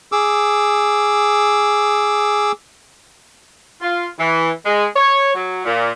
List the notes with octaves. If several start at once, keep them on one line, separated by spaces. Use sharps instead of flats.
G#4 D6 E6
F4
E3
G#3
C#5
F#3
A#2